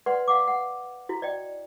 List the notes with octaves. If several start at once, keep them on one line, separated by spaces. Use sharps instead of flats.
B4 D5 F#5 C6
F5 F#5 D6
F#5
E4 F#4
D5 D#5 G5